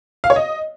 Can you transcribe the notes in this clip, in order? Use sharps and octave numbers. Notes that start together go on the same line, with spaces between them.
F5
C#5
D#5